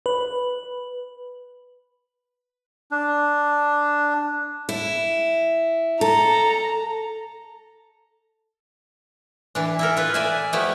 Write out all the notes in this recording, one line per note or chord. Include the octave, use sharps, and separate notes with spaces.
B4
D4
E4
A4 A#5
E3 D4
E4 A4 A#4
F4 B4
D5 E5 G#5
F3 A3 B3 E4 G4